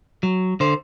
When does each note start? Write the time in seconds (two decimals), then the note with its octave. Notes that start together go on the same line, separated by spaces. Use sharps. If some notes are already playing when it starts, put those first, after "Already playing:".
0.23 F#3
0.60 D3 C5